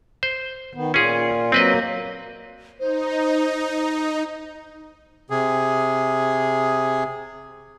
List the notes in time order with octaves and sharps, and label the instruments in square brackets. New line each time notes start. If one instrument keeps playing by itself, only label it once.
[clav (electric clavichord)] C5
[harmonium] D#3 B3
[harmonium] A#2 F4 [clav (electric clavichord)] C#4 G#4
[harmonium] F#3 A#3 [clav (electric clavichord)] C4 B4 D#5
[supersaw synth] D#4 [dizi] C5
[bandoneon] C3 G#4